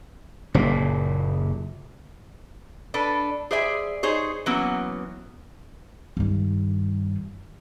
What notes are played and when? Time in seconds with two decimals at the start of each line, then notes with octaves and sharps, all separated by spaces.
0.54 F#1 A#2
2.94 D4 A4 B4
3.51 G#4 C5 D5 E5 G#5
4.03 D#4 G#4 C5 C#5
4.46 E3 F#3 A#3 B3 C#4
6.17 G2 D#3